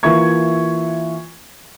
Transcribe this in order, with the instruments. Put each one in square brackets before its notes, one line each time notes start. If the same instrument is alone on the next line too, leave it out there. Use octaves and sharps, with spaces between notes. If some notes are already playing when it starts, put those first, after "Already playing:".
[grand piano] E3 A#3 F4 E5 C#6 G#6